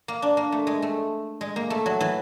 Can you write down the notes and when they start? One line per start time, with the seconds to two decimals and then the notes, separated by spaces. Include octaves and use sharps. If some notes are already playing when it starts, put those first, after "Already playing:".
0.08 A#3
0.22 D4
0.37 A#3
0.52 A3
0.67 G#3
0.82 A3
1.41 G#3
1.56 A#3
1.70 A3
1.86 F#3
2.00 E3